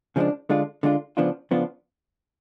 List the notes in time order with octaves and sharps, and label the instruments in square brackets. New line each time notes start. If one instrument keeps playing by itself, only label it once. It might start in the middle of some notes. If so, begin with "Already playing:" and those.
[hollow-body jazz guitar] C#3 F3 G#3 B3 D4
D3 G#3 D4 F4
D3 G#3 D4 F4
C#3 F3 B3 D4 F4
C#3 F3 B3 D4 F4